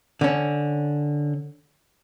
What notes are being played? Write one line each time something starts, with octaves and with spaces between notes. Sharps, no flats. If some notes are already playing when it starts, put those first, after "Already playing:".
D3 C#4